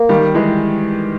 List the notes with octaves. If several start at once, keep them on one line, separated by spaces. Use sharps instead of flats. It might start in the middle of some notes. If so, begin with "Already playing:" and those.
Already playing: A#3
D#3 G3
E3 G#3